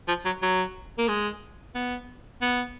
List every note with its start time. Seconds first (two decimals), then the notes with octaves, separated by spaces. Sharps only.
0.08 F3
0.25 F#3
0.42 F#3
0.98 A#3
1.08 G#3
1.75 B3
2.41 B3